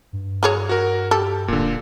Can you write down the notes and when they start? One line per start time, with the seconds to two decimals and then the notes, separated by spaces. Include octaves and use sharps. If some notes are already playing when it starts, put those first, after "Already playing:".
0.13 G2
0.43 F#3 G#4 C#5
0.69 F#4 A#4
1.11 G4 A4
1.48 D1 A#2 D3